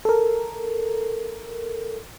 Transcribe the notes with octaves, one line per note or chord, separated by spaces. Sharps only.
A4 A#4